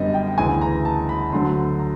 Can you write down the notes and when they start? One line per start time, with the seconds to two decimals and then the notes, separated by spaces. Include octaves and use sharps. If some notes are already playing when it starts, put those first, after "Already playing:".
Already playing: F#2 D3 G3 B3 D#5
0.14 G5
0.38 D2 C#3 E3 G#5
0.61 A#5
0.85 A5
1.09 B5
1.32 D2 D3 F#3 C6
1.79 A#5